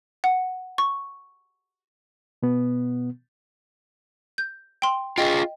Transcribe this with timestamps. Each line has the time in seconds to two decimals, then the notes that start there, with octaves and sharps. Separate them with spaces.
0.24 F#5
0.78 C#6
2.43 B2 B3
4.38 G6
4.82 G5 C6
5.18 F4 G#4 D#5 G5